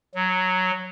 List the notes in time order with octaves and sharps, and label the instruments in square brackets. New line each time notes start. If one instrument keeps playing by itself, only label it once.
[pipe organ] F#3